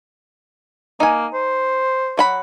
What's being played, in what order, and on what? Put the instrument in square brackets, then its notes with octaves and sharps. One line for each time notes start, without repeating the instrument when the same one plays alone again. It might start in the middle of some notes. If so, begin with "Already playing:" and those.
[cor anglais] A#3 [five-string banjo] D#4 G#5
[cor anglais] C5
[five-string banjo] F#3 F#5 B5